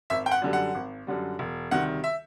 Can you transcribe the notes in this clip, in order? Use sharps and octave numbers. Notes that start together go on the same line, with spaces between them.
G#1 E5
G5
F#5
F#2 D3 G3
F#5
G#1
F#2 D3 G3
E1
D2 C3 D#3 G3 F#5
E5